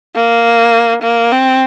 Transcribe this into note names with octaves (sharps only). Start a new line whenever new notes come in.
A#3
A#3
C4